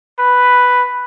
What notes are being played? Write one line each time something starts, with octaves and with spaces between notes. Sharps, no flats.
B4